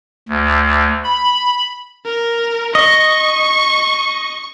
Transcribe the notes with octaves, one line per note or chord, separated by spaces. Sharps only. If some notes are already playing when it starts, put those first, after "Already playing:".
D2
B5
A#4
D#5 C#6